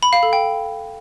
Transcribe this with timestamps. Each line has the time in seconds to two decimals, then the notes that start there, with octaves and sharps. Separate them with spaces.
0.03 B5
0.13 F5
0.23 A4
0.33 G5